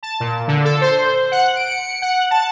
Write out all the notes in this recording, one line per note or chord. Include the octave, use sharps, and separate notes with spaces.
A5
A#2
D3
A4
C5
F#5
D7
C#7
F#5
A5